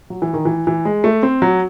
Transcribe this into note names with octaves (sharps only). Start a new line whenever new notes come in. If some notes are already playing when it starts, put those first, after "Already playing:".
F#3
E3
D#3
E3
E3
G#3
A3
C4
F#3